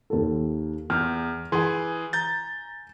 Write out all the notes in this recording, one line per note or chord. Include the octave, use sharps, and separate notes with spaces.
D#2 A4
E2 F6 G6
E3 G#4 G#5 C6
A#5 G6 A6